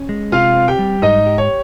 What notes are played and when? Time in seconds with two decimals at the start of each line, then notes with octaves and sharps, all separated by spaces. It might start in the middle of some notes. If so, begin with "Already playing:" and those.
Already playing: C#4
0.09 G#3
0.32 C3 F4 F5
0.56 C4
0.68 G4 G5
0.79 G3
1.02 G#2 D#4 D#5
1.26 G4
1.38 C#5